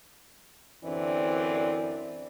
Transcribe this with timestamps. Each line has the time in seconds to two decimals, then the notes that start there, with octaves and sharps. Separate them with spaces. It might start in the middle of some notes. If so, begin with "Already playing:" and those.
0.85 F#2 D3 E3 C4 D4 D5